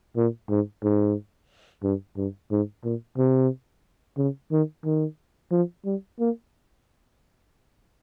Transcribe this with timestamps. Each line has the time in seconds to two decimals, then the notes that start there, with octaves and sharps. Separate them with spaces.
0.17 A#2
0.50 G#2
0.84 G#2
1.84 G2
2.17 G2
2.52 G#2
2.84 A#2
3.18 C3
4.18 C#3
4.52 D#3
4.85 D#3
5.52 F3
5.85 G3
6.20 A#3